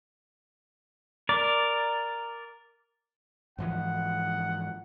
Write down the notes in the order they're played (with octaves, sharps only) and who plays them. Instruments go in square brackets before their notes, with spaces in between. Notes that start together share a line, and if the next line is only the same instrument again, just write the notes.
[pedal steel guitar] A#4 D5
[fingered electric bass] G#2 E3 F3 [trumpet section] D#4 F#5